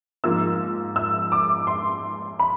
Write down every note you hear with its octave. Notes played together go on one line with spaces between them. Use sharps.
G#2 F3 A#3 E6
E6
D6
C6
B5